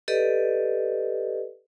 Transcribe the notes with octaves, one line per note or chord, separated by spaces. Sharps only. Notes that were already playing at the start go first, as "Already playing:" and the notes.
G4 A4 B4 D5 D#5